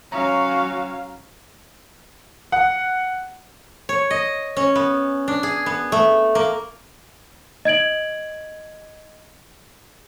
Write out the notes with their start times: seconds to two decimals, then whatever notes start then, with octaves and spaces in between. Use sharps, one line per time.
0.12 F#3 C#4 F#4 F5 A#5
2.52 F#5
3.89 C#5
4.11 D#5
4.57 C#4
4.75 B3
5.28 D4
5.43 G#4
5.66 B3
5.92 A3
6.35 A#3
7.65 D#5 G#6 D7 F#7